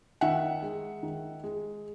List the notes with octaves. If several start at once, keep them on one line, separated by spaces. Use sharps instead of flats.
D#3 E5 F#5
G#3
D#3
G#3